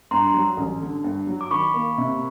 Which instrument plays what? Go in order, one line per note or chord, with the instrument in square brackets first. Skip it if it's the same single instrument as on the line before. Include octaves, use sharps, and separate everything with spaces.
[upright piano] G2 [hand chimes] A#5 C6
[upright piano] F#3
A1
D3
G2
F#3
[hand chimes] D6
[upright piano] D#3 [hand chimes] B5 C#6
[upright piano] A#3
C3